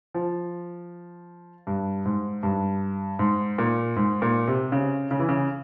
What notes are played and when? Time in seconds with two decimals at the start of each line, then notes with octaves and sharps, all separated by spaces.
0.14 F3
1.67 G2
2.05 G#2
2.43 G2
3.19 G#2
3.58 A#2
3.96 G#2
4.22 A#2
4.48 C3
4.72 C#3
5.11 C#3
5.19 E3
5.29 C#3